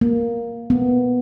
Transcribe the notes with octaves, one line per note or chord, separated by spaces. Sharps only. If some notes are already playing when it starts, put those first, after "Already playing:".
A#3
B3